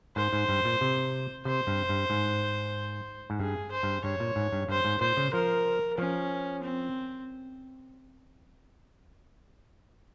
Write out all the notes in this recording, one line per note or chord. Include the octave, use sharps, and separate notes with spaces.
G#2 C5
G#2
G2
A#2
C3
C3 C5
G2
G2
G#2
G#2
G2 G#4
C5
G2
G2 C#5
A#2
G#2
G2
G2 C5
G#2
A#2 C5
C#3
F3 A#4
F3 C#4
C4